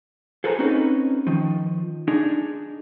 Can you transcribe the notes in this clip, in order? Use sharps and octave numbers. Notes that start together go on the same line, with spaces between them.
G#4 A4 B4 C5 G#5 A#5
C4 C#4 D#4 F#4 B4
D#3 F3
D4 D#4 G#4